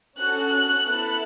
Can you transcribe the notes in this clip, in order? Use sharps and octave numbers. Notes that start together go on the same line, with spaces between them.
C#4 F#4 A4 F#6
F#6
B3 E4 A4